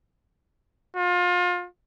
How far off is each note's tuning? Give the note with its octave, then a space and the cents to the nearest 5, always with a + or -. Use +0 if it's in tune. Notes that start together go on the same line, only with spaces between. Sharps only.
F4 +30